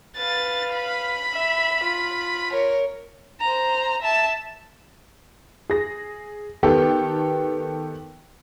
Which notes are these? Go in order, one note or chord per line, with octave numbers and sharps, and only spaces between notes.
B4 F5 A6
B5
E5
F4
A#4 C#5
C5 A#5
E5 A5
G#4 A#6
D#3 B3 G4 A4